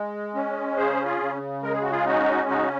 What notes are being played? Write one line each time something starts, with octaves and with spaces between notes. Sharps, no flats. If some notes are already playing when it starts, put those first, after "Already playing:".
Already playing: G#3
C#4
C#3 G#4 C5
F4 G#4
C#3
G#3 A#4
G#4
F#4
F4 G#4
C#4 D#4 F#4
C#3 D#4 F#4